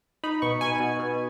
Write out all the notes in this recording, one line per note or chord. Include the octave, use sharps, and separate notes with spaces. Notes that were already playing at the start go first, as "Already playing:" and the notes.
D#4 B5
B2 C#6
B2 G#5
B2
B2